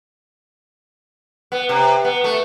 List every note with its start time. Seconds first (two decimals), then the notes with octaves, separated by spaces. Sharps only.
1.52 B3
1.69 C3
2.04 B3
2.24 A3